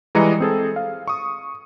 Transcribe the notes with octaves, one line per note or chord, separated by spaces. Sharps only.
E3 G3 G#3 D#5 A#5 C#7
C4 G#4 A4
F5
C#6 D#6